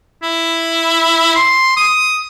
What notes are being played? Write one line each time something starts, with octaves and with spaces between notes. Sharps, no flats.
E4
C6
D#6